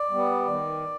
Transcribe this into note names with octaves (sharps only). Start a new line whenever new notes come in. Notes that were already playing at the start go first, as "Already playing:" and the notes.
Already playing: D5
G3 B3
D#3